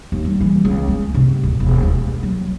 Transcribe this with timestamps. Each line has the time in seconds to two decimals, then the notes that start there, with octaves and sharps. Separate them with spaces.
0.12 D#2
0.25 G3
0.41 E3
0.65 C#2
0.88 B3
1.14 C3
1.43 D1
1.60 E1
1.83 D#2
2.23 F#3